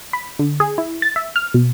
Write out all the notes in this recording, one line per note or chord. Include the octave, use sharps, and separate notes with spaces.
B5
D3
G#4
E4
A6
E5
F6
B2